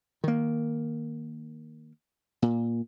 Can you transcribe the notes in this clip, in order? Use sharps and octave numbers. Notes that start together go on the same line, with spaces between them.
D#3 A#3
A#2